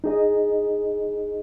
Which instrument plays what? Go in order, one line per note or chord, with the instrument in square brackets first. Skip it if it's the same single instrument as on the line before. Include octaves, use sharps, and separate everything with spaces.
[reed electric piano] D#4 G#4 D#5